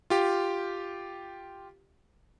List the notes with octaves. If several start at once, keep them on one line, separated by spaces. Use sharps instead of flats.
F4 G4